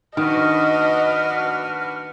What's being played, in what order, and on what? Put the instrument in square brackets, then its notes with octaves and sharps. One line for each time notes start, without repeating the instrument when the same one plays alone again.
[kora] D#3 [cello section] D4 F#4 B4 [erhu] D#5 [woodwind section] F#5 F6